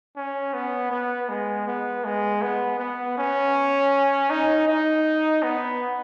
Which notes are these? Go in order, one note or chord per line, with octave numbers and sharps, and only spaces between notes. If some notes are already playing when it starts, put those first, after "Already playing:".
C#4
B3
B3
G#3
B3
G#3
B3
B3
C#4
D#4
D#4
B3